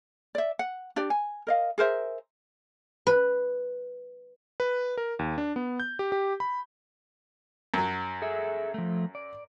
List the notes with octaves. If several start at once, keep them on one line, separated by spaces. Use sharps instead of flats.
D5 E5
F#5
D4 G4 D5
G#5
A#4 D#5 F5
G#4 A#4 C5 E5
B4
B4
A#4
D#2
D4
B3
G6
G4
G4
B5
F#2 F#3
G#4 A4 E5
F3 A3
D5